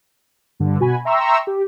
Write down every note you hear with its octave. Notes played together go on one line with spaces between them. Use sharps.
G2 D3
B2 F#4 G#5 B5
E5 G5 A#5 C6 C#6 E6
G4